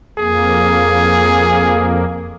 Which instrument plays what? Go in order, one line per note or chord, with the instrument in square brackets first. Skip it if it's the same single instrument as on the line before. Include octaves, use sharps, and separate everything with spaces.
[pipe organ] F2 A#3 [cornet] G#4